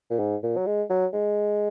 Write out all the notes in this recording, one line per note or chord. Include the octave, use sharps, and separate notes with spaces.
A#2
G#2
A#2
F#3
G#3
F#3
G#3